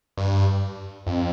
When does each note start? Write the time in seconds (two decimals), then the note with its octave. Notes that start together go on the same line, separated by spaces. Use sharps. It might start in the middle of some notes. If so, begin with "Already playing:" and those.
0.18 G2
1.07 F2